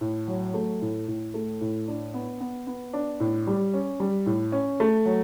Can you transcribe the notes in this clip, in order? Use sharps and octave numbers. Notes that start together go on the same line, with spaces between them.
A2
F#3
A3
A2
A2
A3
A2
D4
B3
B3
B3
D4
A2
G3
C#4
G3
A2
C#4
A3
F#3